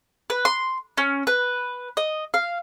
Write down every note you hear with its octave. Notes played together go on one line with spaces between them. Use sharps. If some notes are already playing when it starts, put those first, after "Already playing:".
B4
C6
C#4
B4
D#5
F5